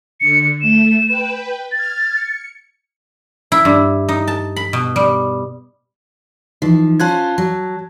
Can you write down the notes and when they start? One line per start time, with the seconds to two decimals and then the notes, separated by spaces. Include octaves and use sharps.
0.21 D3 C#7
0.62 A3 E7
1.07 B4 G5
1.72 F6 G#6 A6
2.14 C#7
3.52 E4
3.65 G2
4.09 D#4
4.27 A5
4.56 B5
4.73 B2
4.96 G3
6.62 E3 F3 D#4
7.00 C#4 F4 C5 A5 F#6 G#6
7.38 F#3